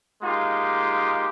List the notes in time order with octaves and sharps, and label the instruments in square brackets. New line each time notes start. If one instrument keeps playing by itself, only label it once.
[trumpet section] G#3 A#3 D#4 F4 G4